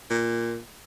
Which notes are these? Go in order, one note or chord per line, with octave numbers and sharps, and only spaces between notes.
A#2